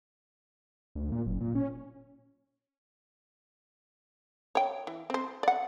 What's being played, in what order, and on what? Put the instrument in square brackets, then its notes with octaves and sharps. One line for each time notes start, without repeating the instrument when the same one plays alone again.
[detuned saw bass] D2
A#2
F#1
A#2
C#4
[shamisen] C#5 G5
E3
C4 C5
D5 F#5